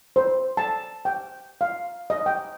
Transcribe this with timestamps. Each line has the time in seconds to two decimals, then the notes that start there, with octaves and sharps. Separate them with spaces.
0.16 C5
0.57 A5
1.05 G5
1.61 F5
2.10 D#5
2.26 G5